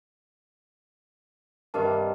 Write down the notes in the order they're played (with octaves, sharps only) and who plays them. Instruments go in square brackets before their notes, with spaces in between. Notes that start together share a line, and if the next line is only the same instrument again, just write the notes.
[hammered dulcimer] G2 C3 D#3 [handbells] G4 A#4 A5